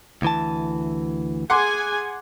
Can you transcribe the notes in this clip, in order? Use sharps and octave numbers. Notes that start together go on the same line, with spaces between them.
D2 E3 A5
G#4 F#5 G#5 C6 D6